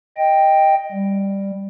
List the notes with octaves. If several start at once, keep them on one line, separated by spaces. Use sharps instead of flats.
D#5 G5
G3